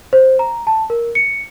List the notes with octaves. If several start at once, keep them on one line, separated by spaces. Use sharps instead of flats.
C5
A#5
A5
A#4
C#7